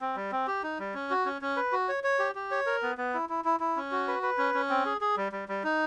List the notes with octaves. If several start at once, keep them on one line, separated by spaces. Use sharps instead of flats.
C4
G3
C4
G4
D#4
G3
C#4
F#4
C#4
C#4
B4
F#4
C#5
C#5
G4
G4
C#5
A#4
B3
B3
E4
E4
E4
E4
C#4
F#4
B4
B4
C#4
C#4
C4
G#4
G#4
G3
G3
G3
D#4